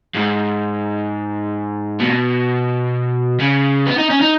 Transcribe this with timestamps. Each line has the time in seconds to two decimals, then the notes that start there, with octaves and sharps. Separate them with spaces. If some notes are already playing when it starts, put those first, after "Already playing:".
0.14 G#2
2.00 B2
3.40 C#3
3.86 B3
3.98 D#4
4.10 C#4
4.21 D#4